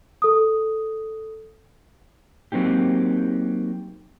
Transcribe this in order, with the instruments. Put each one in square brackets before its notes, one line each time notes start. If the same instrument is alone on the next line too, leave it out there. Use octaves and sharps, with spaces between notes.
[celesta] A4 D#6
[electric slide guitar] F#3 A#3 C4 D#4 G4